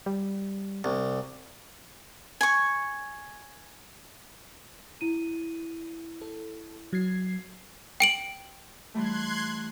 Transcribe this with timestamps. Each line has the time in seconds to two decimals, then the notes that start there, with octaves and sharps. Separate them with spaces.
0.06 G3
0.84 C2
2.41 G#5 C#6
5.01 E4 D#7
6.21 A4
6.93 F#3 G#6 C7
8.00 G5 D7 F#7
8.94 E3 G3 A3 C6 F#6 G#6